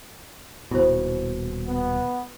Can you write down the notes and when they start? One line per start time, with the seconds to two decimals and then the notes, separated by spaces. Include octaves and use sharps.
0.71 D#1 B2 E4 C5
1.67 B3